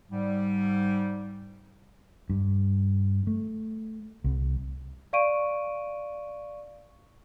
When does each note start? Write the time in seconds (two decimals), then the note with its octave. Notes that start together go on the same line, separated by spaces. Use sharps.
0.10 G#2 G3
2.30 G2
3.27 A3
4.24 C2
5.13 D5 F5 C#6 D7 D#7